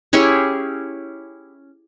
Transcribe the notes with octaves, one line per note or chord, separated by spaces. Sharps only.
C#4 E4 G4 G#4